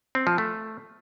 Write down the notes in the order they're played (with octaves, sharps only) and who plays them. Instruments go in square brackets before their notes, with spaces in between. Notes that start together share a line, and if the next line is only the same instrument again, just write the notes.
[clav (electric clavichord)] C4
F3
A3